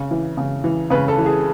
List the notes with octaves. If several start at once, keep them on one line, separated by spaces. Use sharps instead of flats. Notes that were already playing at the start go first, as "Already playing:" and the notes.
Already playing: C#3
E3
C#3
E3
C#3 B4
A4
E3
G#4